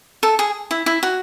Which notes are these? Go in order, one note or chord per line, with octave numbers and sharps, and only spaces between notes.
A4
G#4
E4
E4
F#4